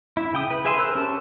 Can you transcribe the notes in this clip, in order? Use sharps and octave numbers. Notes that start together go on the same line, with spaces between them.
E4
C#3 G5 D#6
B4
G#4 B4 E5 G#5 C6
A#4 C5 E6 F#6
C#4 G4 A5